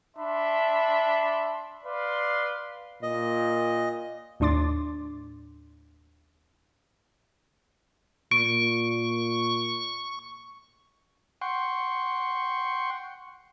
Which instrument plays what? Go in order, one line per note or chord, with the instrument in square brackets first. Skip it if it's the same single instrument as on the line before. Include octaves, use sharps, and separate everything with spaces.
[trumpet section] D4 E5 B5 C6
B4 D5 F5 C6
[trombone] A#2 [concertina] D#5
[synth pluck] D#2 A2 D4 C6 D6 A6
[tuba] A#2 [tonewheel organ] C#6 [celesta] D7
[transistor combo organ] F#5 G5 C6 C#6